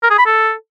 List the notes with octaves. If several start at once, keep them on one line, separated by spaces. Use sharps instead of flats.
A#4
G#4
B5
A4